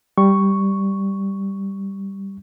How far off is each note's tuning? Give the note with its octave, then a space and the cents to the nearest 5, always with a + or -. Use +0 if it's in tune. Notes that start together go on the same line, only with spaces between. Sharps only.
G3 +0 C#6 +0